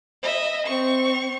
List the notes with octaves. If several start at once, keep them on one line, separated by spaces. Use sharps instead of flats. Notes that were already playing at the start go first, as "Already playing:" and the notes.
D#5 E5
C4 C#6